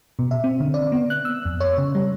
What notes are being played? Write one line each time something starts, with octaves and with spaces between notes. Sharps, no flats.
B2
E5
C4
D3
D5
B3
F#6
E6
F2
C#5
C#3
G3